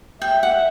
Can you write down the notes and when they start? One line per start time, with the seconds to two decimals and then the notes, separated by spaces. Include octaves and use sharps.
0.21 E5 G5
0.43 F#5